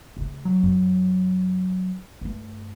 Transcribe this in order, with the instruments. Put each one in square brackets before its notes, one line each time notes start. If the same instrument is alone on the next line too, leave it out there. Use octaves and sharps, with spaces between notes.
[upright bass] C#3 A3
[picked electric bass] F#3
[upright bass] F#2
G2 A3